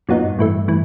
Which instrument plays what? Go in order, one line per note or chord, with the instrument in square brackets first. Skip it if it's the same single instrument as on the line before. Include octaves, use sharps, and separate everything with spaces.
[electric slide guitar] F#2 [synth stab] A#2 F#3 B3 D#4
[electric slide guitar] G2
[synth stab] A2 E3 A3
A2 E3